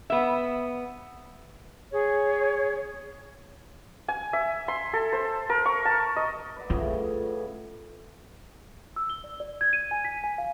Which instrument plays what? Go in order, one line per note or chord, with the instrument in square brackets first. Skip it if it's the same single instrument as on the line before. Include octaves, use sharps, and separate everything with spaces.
[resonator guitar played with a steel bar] B3 E5
[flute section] G#4 C#5
[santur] G#5
E5
C6
A4
C5
A#4
C#6
A5
D#5
[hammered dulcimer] B4 D5 F#5
[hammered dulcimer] A2 C#3 G#4 [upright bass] F4
[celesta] E6
G7
D5
D5
G#6
D#7
G#5
B6
G#5
F5